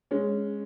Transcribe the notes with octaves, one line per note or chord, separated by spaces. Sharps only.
G#3 C#4